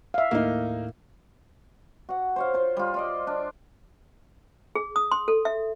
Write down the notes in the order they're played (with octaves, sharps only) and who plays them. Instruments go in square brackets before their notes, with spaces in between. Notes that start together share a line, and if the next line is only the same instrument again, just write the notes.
[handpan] E5 F5
[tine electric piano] D#2 A2 [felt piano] A#3 D#4
[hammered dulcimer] F#4 F#5
C5 C#5 F5
F4 C5
G3 F4
F4 D5 D#5
D4
[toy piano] G#4
D#6
C6
A4
E5